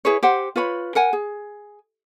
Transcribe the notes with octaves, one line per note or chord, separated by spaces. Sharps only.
E4 G#4 B4 C#5
G4 C5 F#5
F4 B4 C#5 B5
A#4 F#5 G#5
G#4